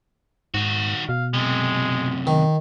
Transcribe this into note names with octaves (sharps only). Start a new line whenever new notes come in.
G#2 D#3 F#4
B2 F5
F#2 C3 G#3
D#3